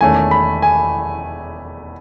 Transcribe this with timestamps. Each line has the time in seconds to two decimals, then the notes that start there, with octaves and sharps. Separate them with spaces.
0.01 E1 E2 D#3 A3 C#4 G#5
0.31 B5
0.62 G#5